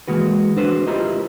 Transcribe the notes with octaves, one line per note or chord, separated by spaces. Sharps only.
E3 G#3 A#3 F#4 B4
D4 F#4 B4 C5
E4 F4 G4 A#4 C5 D#5